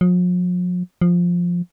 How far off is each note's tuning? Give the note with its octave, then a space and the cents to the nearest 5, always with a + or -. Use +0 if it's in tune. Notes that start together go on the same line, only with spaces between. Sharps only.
F3 +45
F3 +5